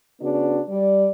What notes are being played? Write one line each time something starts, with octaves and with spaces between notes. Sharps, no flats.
C#3 B3 D4 F#4
G3 D5